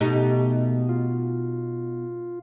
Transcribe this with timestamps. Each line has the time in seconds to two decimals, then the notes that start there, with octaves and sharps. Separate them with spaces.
0.01 B2 A3 D#4 G4
0.89 F4